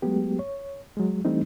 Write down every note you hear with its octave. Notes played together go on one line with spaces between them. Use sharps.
F#3 G#3 A3 B3 G4
C#5
F#3 G#3
E3 G3 A3 C4 D4 D#4